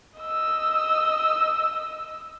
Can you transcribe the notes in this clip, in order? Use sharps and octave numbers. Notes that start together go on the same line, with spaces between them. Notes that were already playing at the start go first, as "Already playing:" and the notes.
D#5 E6